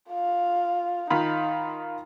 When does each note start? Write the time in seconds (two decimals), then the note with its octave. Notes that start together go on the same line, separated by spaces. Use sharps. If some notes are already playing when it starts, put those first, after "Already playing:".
0.11 F4 F5
1.10 D#3 D#4 F4 B5